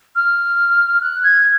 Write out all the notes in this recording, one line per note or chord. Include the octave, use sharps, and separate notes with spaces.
F6
F#6
G#6